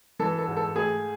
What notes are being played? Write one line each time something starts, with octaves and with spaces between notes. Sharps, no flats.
E3 A4
A4
G#2
A4
A3 G#4